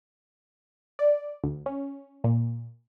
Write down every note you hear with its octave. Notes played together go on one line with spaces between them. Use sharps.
D5
D2
C#4
A#2